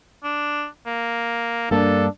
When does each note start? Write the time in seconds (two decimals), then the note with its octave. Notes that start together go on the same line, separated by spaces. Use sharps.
0.24 D4
0.86 A#3
1.71 G2 A#3 D4 A4